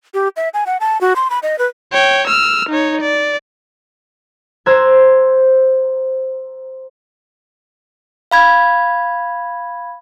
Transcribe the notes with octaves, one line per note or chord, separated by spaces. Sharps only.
G4
E5
G#5
F#5
A5
F#4
C6
B5
D#5
B4
C#5 G5
E6 F6
D#4 C#5
D5
C5 A#5 E6 F#6 G#6
F5 B5 G#6